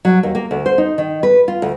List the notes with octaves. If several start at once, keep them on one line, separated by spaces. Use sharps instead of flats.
F#3
D#2
A#3
D2
C5
D#4
D#3
B4
F4
D2